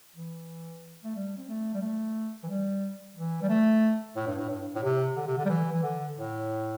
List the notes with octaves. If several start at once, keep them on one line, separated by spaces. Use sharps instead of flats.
E3
A3
G3
C4
A3
G3
A3
E3
G3
E3
G3
A3
A2
G2
A2
G2
A2
C3
D3
C3
D3
G3
E3
E3
D3
A2